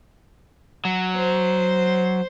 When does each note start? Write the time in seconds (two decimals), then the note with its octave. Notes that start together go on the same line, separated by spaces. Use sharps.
0.85 F#3
1.16 C5